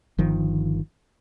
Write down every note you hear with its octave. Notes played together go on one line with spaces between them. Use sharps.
G1 D#3 F3